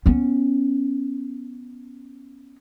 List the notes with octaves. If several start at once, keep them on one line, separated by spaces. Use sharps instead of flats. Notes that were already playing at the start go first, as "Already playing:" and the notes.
B3 C#4